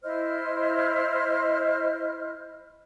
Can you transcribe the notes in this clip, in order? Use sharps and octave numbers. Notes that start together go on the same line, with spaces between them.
E4 C5 D#5 F6